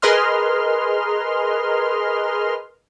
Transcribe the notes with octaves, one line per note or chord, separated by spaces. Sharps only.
G#4 A#4 B4 D#5 C6 F6